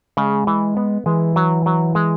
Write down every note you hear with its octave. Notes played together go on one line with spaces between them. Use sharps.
C#3 G#3
E3
B3
E3 G#3
F#3
F#3
G#3